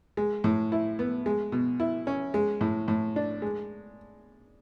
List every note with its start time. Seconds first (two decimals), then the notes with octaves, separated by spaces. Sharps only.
0.17 G#3
0.44 A2
0.72 E4
0.99 B3
1.26 G#3
1.52 B2
1.80 E4
2.07 C#4
2.34 G#3
2.61 A2
2.88 A2
3.16 D4
3.42 G#3